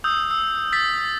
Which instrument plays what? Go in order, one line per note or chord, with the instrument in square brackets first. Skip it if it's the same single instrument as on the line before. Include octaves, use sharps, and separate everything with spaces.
[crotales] D#6 E6 G6
E6
E6 A6 B6